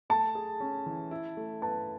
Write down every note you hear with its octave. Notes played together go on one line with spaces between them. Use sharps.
A3 A5
G#4
C#4
E3
E4
A3
B4 A5